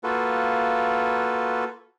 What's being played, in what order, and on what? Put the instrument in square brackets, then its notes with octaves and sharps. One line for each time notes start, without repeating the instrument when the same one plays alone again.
[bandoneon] A#3 F4 F#4 A4 B4